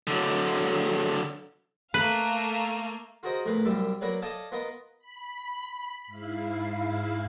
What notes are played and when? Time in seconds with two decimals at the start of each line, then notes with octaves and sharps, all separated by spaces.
0.07 D3 F#3
1.94 A3 A#3 B4 F5
3.23 F4 F#4 G#4 A#4 C5 D#5
3.45 A#1 E2 A2 A#4 B4 F5
3.65 C2 F#2 G3 E5 C6 D6
4.01 F#3 A#3 A#4 B4 C#5 D5
4.22 A4 D5 D#5 F5 G#5 A5
4.52 B3 F4 A#4 D#5 C6
4.99 B5
6.07 G#2 E4 F5